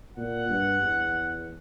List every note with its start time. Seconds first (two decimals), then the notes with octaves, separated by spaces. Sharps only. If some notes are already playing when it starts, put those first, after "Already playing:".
0.17 A#2 F#5
0.49 G2
0.81 E2